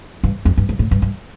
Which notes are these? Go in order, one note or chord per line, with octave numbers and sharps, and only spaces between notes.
G2
F2
G2
G2
A2
G2
G2